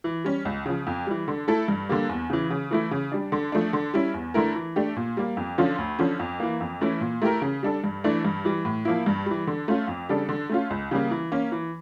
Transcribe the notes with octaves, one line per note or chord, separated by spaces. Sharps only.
E3
G3 C#4
C#2
C#3 F3
F2
E3 G3
D3
A3 E4 A4
G2
D3 G3 A#3
E2
C#3 E3
C#3
E3 A3 E4
C#3
G3 D4
D3
F3 A3 D4
D3
G3 C#4 E4
E2
D3 A3 E4 A#4
E3
A3 D4 G4
A#2
G3 A#3
F2
D3 F3 C#4 F4
D2
D3 F3 C#4
F2
E3 A#3
F2
E3 A3 C#4 E4
A#2
A3 E4 G4 A#4
C#3
G3 D4 A4
G2
E3 A3 D4
G2
E3 G3
A2
F3 A#3 E4
G2
E3 G3
D3
A3 C#4 F4
F2
C#3 G3 D4 A4
D3
A3 C#4 F4
C#2
C#3 G3 A#3
E3
A#3 C#4
E3